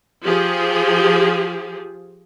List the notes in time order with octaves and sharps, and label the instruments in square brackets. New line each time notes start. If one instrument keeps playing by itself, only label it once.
[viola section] F3 G4 G#4